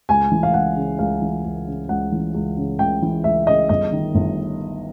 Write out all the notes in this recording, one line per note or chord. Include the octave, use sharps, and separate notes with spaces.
C#2 G#5
E3
F5
C#2 F#5
C#3
C#2 F5
E3
C#2
C#3
C#2 F#5
E3
C#2
C#3
C#2 G5
E3
C#2 E5
C#3 D#5
G1 D#5
D#3
G1